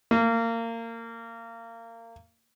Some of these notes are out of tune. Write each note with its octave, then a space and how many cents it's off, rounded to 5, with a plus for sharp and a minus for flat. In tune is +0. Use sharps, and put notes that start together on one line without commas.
A#3 -25